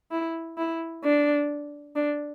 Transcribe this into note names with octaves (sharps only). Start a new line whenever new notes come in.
E4
E4
D4
D4